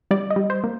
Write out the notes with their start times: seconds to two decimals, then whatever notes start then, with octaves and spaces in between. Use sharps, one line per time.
0.11 G3 D5
0.30 D#5
0.36 G3
0.50 C5
0.64 A#3